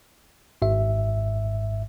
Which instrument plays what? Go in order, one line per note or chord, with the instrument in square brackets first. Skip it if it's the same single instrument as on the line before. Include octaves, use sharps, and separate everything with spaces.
[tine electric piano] G#1 G#2 E5